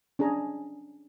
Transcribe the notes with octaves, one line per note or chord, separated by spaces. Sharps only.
C#4 D4 G#4 A#5